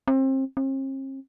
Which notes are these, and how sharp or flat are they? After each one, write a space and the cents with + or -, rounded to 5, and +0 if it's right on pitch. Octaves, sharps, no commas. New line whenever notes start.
C4 +30
C4 +45